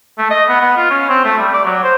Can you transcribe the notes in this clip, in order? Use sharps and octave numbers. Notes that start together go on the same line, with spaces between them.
A3
D#5
B3
B3
F4
C#4
C4
A3
G3
D5
F#3
C5